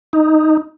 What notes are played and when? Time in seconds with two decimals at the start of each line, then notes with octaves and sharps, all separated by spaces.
0.13 D#4